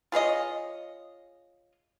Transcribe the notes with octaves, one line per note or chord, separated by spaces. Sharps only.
F4 G#4 C#5 D#5